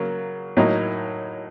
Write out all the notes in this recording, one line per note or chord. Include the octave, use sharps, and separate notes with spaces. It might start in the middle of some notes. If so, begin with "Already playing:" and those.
Already playing: C#3 F#3 A#3
A2 F#3 A#3 D#4